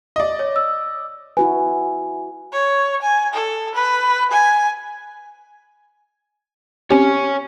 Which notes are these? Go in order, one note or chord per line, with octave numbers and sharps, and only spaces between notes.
D5 D#5
C#5
E6
E4 F#4 B4 G#5
C#5
G#5
A4
B4
G#5
C4 C#4 G4 C#5 G#5